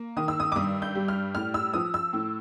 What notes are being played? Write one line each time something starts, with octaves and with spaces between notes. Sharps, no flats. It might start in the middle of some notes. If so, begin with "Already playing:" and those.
Already playing: A#3
D#3 D#6
E6
D#6
D6
G2 D#6
G6
G3
F6
A2 F6
E6
F3 D#6
E6
A2